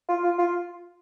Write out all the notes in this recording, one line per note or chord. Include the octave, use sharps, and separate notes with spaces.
F4
F4
F4